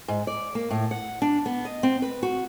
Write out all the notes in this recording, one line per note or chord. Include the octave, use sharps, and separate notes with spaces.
G#2
D5
A#3
A2
F#5
D4
B3
D#5
C4
B4
F#4